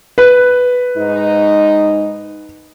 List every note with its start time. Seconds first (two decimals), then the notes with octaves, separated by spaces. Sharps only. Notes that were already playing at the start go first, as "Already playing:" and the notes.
0.18 B4
0.96 G#2 D#4